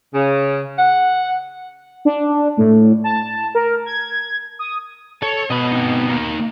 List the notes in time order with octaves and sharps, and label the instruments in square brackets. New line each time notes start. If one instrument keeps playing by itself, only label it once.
[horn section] C#3
F#5
[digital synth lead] D4
A2
A5
A#4
G#6
D#6
[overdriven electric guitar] A4 [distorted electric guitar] C#5
[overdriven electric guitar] B2 B3 [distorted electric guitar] D#5 B5
[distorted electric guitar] C4 D#4
A#3 D#4